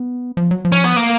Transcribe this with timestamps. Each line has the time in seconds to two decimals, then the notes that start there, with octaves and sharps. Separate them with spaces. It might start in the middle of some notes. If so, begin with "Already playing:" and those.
Already playing: B3
0.37 F3
0.51 F#3
0.65 F3
0.72 C#4
0.84 B3
0.96 A#3